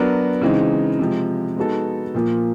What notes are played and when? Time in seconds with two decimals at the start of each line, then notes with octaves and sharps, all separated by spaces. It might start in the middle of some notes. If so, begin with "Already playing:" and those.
Already playing: F#3 B3 D4 F#4 A#4
0.41 C#3 E3 G#3 C4 D#4
0.99 C3 F3 G#3
1.57 G#3 B3 D#4 F#4 A4
2.15 A#2 F3 A#3